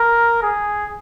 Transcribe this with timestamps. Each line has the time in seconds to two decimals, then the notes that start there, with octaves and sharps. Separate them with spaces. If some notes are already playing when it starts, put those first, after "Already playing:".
Already playing: A#4
0.43 G#4